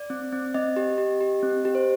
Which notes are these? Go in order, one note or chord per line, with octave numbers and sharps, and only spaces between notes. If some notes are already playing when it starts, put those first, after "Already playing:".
Already playing: D5
C4
C4
C4 D#5
G4
G4
G4
C4
G4
C5